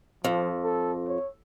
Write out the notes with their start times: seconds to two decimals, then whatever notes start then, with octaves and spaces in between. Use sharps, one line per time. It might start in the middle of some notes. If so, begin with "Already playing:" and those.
0.24 F2 F3
0.64 A4
1.08 C#5